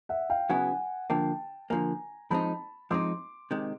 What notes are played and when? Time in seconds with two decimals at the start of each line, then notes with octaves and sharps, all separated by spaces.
0.09 E5 F#5
0.30 F5 G5
0.49 C#3 F#3 B3 E4 F#5 G#5
1.10 D3 F3 A#3 G5 A5
1.70 D3 F3 A#3 G#5 A#5
2.30 F3 G#3 C4 D#4 A5 B5
2.90 F3 G#3 C4 D#4 C6 D6
3.51 C3 D#3 G#3